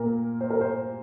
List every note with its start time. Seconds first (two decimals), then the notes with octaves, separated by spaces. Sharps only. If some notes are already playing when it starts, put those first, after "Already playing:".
Already playing: A#2 A#3 A#4
0.41 C5
0.50 A#4
0.61 C5